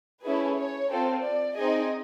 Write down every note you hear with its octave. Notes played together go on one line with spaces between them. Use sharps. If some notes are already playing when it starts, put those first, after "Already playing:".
A3 C#4 E4 G#4 B4
C#5
C4 F4 A4
D5
C4 D#4 G#4 D#5